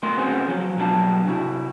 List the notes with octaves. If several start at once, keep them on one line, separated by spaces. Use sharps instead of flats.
D3 A3 A#4 C6
C4 C#4 F#4 G#4 B4 C5
F3 F#3
B1 F#3 G3 D4 A5
C3 E4 F#4